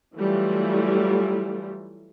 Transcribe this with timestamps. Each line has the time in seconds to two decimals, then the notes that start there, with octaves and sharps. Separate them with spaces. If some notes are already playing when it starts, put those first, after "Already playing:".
0.17 E3 F#3 G3 A3 F4